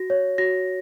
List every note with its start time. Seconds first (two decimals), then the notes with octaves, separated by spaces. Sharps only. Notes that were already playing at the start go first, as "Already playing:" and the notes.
Already playing: F#4 A#6
0.10 C#5
0.38 F#4 A#6